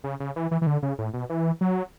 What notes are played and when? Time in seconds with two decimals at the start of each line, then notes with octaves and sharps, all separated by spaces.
0.04 C#3
0.20 C#3
0.36 E3
0.51 E3
0.62 E3
0.67 D3
0.83 C#3
0.98 A2
1.14 B2
1.29 E3
1.61 F#3